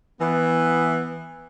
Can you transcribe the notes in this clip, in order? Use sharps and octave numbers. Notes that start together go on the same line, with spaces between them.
E3 B3